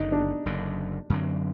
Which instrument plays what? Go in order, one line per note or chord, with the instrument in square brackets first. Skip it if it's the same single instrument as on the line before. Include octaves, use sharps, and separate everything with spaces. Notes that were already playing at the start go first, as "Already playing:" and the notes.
Already playing: [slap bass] F#1 F#2 D3 [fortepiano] D#4
[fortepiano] D4
[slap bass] F#1 F#2 D3
F#2 D3 F#3 C4